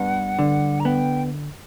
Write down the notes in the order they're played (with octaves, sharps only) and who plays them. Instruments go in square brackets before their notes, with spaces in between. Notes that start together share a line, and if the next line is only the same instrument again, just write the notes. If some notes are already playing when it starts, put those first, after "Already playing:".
Already playing: [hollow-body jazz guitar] G2 B3 [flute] F#5
[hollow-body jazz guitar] D3
[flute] A#5
[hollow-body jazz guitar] B3 [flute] G5